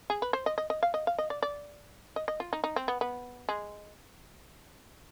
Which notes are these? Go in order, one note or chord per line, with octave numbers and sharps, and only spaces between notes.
G#4
B4
C5
D#5
D#5
D#5
F5
D#5
F5
D#5
D5
D5
D#5
D#5
F4
D#4
D#4
C4
B3
B3
G#3